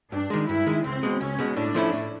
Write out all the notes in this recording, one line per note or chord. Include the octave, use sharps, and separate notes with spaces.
G2 D4
D#3 G#3
G2 E4
D#3 G#3
C#2 C4
B2 G#3
C#2 C#4
B2 G#3
A2 D4
F3 A3 C#4 E4
A2